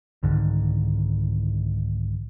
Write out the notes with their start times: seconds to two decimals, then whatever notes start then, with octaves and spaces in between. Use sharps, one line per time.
0.23 C2 G#2 D3 D#3